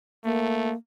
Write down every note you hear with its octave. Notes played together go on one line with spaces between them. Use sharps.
A3 A#3